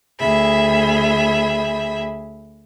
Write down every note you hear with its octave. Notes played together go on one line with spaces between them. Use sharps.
D2 G#4 E5 B5